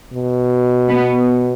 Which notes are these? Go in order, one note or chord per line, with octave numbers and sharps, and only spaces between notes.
B2
B3